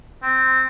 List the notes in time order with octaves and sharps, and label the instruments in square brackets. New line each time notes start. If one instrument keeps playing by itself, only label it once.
[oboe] C4